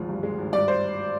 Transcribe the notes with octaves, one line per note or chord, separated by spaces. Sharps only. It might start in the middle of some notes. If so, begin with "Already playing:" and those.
Already playing: G#1 D2 F3 G#3
G2
G#3
G#1
G2 D5
C5